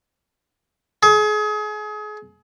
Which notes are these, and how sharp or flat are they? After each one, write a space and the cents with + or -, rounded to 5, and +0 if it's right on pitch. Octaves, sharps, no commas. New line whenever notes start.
G#4 +30